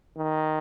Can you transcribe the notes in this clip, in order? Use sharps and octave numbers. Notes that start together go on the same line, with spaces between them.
D#3